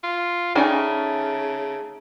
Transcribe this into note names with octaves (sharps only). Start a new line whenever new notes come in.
F4
C#3 G3 A3 C#4 D#4 G#5